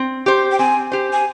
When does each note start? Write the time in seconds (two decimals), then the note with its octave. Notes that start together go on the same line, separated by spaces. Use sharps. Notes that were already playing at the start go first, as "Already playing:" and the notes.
Already playing: C4
0.26 G4 C5
0.52 G5
0.59 C4 G#5
0.92 G4 C5
1.13 G#5